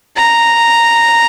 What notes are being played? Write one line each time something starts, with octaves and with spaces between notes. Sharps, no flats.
A#5